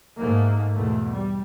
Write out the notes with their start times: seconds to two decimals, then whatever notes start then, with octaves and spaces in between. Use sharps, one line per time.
0.18 G#2 A3 A#3
0.74 E2 B2 A3
1.12 G3